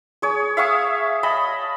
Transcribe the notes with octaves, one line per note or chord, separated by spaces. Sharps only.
G#4 C#5
E5 F5 C#6 D#6
D#5 A5 B5